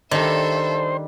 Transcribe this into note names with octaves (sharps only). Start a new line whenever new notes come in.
D#3 G3 D4 A4 C5 E5